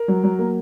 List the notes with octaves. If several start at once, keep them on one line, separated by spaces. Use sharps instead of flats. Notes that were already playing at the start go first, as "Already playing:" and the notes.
Already playing: A#4
F#3
F#3
A#3